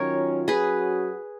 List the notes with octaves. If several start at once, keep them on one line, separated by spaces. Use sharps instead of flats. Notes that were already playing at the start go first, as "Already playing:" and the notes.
Already playing: D#3 F#3 C#4 F4 A#4 C#5
F#3 C#4 F#4 G#4 B4